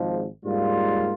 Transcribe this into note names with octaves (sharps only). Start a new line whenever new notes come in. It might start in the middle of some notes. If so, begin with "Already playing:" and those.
Already playing: G#1 G#2 F3
G#2 G3 A#3 F4